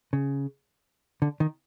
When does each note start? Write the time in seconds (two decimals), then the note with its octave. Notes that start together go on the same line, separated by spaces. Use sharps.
0.13 C#3
1.22 D3
1.40 D#3